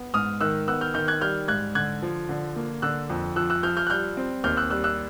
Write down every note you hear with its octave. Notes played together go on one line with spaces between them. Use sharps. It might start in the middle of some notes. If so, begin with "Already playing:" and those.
Already playing: B3
G#2 D#6 F6
D#3 E6 F#6
B3 E6 F#6
F6 G6
D#3 F6 G6
F#6 G#6
G3 F6 G6
G#2 F#6 G#6
D3 F#6 G#6
F3
D3
A#3
D3 E6 F#6
F2
F3 E6 F#6
E6 F#6
F3 F6 G6
F6 G6
F#6
G3 F6 G6
C4
D#2 F6 G6
E6 F#6
G3 E6 F#6
E6 F#6